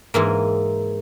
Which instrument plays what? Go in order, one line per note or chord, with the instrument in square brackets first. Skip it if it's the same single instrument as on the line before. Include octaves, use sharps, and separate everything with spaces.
[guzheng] G#2 E3 A#3